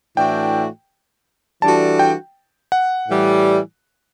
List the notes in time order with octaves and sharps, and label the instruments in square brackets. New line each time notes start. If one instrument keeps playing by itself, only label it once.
[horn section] A2 E3 A3 D4 F#4 [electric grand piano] G5
[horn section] E3 G3 D4 F#4 A4 [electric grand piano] A5
[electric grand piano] G5
F#5
[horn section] A2 E3 G3